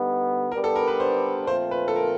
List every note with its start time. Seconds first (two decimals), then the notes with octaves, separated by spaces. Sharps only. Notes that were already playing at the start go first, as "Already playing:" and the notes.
Already playing: D3 G3 B3 D#4
0.52 G3 B3 D4 A#4
0.64 A4
0.76 A#4
0.88 B4
1.00 C5
1.47 A#2 F3 A3 C4 F4 C5
1.71 B4
1.88 A4
1.96 A#4